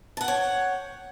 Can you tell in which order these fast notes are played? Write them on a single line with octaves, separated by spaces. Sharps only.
A5 F#5 G5 C#5